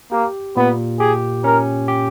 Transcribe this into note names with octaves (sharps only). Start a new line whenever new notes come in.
A#3 G4
A#2 B3
G4 G#4
C#4 A#4
G4